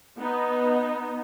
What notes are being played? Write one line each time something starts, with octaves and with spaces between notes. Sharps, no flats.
B3 D#4